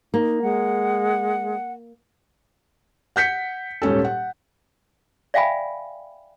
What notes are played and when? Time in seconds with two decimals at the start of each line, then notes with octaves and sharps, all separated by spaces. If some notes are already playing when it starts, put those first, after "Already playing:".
0.14 A#3 D#4
0.42 G#3 F#5
3.16 F#5 G6 B6 C#7
3.82 D#1 G#2 C#4 A4
4.05 F#5
5.34 D5 E5 F5 G5 G#5 B5